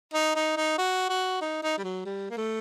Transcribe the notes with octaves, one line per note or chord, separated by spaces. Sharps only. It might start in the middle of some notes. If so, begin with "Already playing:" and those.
D#4
D#4
D#4
F#4
F#4
D#4
D#4
G3
F#3
G3
A#3
A3